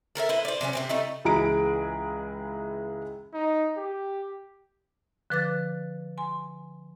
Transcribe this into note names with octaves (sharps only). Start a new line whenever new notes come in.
A4 A#4 C#5 E5
E4 B4 C5
C5 D5
C3 F#3 A3 C#4
C3 A#3 C4
G3 A3 D#4 E4
C#2 E3 G#4 A#5 B5 D7
D#4
G4
D3 F3 B4 D6 F#6 A6
G#5 C6